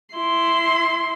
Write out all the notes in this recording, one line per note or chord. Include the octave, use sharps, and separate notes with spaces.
E4 C6